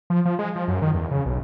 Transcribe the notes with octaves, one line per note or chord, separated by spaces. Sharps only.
F3
F3
G#3
F3
F#2
D#3
E2
C#3
B1